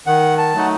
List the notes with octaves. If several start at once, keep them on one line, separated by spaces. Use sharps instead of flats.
D#3 F#5
A5
F#3 A3 D#4 F#5